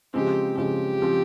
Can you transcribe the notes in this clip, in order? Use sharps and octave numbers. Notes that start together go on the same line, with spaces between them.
C#3 F3 G#3 C4 G4
C#3 F3 G#3 C4 G4
C#3 F3 G#3 C4